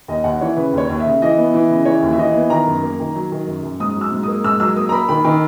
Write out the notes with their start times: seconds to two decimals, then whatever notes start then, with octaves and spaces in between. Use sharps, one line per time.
0.08 D#2 D#5
0.24 D#2 F#5
0.41 E3 C#5
0.56 C#3 B4
0.73 D#2 C#5
0.90 D#2
1.00 E5
1.06 C#3
1.22 E3 D#5
1.37 B3
1.53 E3
1.70 C#3
1.85 E3 C#5
2.03 D#2
2.13 E5
2.18 E3 D#5
2.34 B3
2.50 D#3 A#5
2.67 F#2
2.83 A#3
3.00 D#3
3.15 F#3
3.32 D#3
3.48 F#2
3.63 F#2
3.80 G#2 D#6
3.96 F#3 E6
4.12 G#2
4.23 A#3 D#6
4.44 G#2 E6
4.60 F#3 E6
4.76 A#3 D#6
4.89 A#5
4.92 A#3 B5
5.09 D#3 B5
5.25 D#3